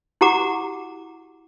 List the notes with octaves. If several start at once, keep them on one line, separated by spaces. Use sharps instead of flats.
E4 F#4 G4 F#5 A#5 D6